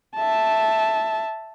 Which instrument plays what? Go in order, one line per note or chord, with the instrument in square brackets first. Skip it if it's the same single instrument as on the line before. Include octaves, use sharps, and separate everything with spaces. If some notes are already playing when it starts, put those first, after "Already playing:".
[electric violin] E5 A5